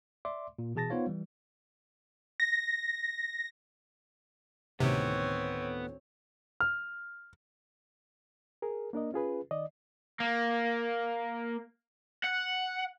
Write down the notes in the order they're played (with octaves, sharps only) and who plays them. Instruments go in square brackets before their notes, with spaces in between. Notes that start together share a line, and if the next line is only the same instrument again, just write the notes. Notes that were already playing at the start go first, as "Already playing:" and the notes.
[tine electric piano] D5 E5 C6 D6
A#2
B2 E3 G#4 A5 A6 A#6
B3 D#4 F4 C5 C#5 F5
E3 G3
[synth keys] A#6
[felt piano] D2 A2 D#3 [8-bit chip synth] C3 [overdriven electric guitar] B3 [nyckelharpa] C4 C#5
[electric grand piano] F6
[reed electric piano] G#4 A#4
A#3 D4 A#4 D#5
C#4 F4 G#4 B4
D#3 D5 D#5
[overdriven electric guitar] A#3
F#5